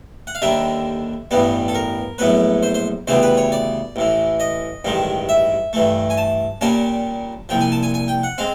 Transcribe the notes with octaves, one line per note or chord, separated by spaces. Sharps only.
F#5
F5
D#2 D3 G3 A#3 E5
A1 G2 E3 G3 B3
A4
A#4
A#1 A2 F#3 B3 B4
C5
C5
D2 C#3 E3 G3 B3 C5
B4
C#5
D5
A1 A2 E3
D#5
A1 G2 D#3 G#3
E5
G2 E3 A3
G#5
A5
A#2 G3 A#3 C#4 A5
C2 A#2 F3 G5
G#5
A5
G#5
G#5
G5
F#5
G#3 C4 F5